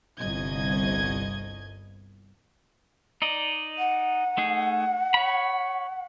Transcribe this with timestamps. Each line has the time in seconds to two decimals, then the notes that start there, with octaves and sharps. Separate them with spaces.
0.19 G1 C2 D#5 G#6
3.22 D#4 D5 D#5
3.78 F#5
4.37 A3 D#4 G#4
5.14 C#5 B5